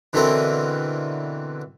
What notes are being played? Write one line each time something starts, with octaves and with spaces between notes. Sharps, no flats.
B2 D3 E3 C4 A4 A#4